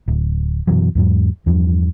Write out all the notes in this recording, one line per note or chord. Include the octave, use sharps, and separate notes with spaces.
D1
F#2 B2 E3 F#3
E2 G#2 F#3
E2 G2 F3